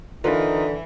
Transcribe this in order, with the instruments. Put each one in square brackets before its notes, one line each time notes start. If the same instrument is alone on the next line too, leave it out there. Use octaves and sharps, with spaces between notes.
[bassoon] D3 [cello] E3 [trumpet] D#4 [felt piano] F4 A#4 B4